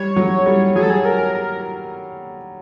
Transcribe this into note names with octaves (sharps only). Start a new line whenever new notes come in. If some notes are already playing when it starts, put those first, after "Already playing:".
Already playing: G3 C#5
F#3
G3
F#3 G#4
A4
G#4
A#4
A#4